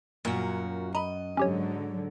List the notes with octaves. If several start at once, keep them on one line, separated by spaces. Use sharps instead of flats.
F#2 A#2 F#4
D#5 A#5 B5
G#2 D3 F#3 C#4 G4 C#5